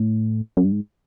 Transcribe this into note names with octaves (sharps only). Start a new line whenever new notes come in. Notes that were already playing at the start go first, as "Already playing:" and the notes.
Already playing: A2
F#2
G2
G#2